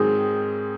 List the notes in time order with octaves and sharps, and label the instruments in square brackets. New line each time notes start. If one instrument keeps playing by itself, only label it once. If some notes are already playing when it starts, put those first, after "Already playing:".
Already playing: [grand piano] G#2 D#3 F#3 C4 [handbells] G#4